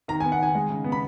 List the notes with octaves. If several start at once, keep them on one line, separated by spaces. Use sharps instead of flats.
D#3 A#5
G#5
B3
F#5
D#3 G#5
G#3
C#3
B3
B5